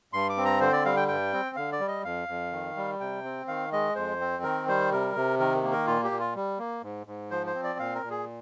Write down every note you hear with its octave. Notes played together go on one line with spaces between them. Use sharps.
G2 C6
D6
C4
A#5
D3 C5
D5
G3 F5
G5
G2 G5
C4
D3 F5
D5
G3
D#5
F2 F5
F2
D#3
G3
C3 G5
C4
D#3 F5
G#3 D#5
F2 C5
C4
D#3 A#4
G3 C5
C3 A#4
C3
D#3 A#4
A#3
A#4
A#2 F4
G4
A#2
F4
G3
A#3
G#2
G#2
F3 C5
C5
C4
D5
A#2 F5
A#4
A#2
G#4